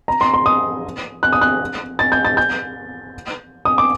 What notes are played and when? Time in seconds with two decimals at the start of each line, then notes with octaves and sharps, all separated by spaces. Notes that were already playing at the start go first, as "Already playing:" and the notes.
0.08 A#5
0.21 C6
0.34 C6
0.46 D#6
1.23 F#6
1.33 D#6
1.41 F#6
1.99 A6
2.12 G6
2.25 A6
2.37 G6
3.65 D#6
3.78 D6